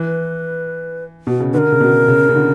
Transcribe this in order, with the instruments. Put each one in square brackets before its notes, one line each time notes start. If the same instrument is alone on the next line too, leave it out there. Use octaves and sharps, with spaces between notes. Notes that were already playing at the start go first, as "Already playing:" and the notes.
Already playing: [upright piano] E3 [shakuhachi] B4
[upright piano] B2
C#3
[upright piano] D3 [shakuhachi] B4
[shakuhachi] A#4
[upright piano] C#3
B2
C#3
C#3
D3